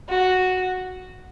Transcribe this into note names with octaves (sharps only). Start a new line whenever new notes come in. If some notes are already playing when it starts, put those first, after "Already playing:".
F#4